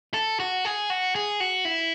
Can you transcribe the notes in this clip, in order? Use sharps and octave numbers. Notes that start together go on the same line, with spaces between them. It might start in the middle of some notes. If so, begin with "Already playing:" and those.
A4
F#4
G#4
F#4
G#4
F#4
E4